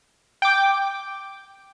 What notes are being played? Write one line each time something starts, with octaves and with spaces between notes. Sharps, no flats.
G5 D6